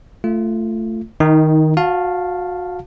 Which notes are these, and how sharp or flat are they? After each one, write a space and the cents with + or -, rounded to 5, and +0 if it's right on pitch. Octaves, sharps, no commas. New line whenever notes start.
A3 +10 F4 -15
D#3 +5 D#4 +30
F#4 -30 F5 +0 A5 +0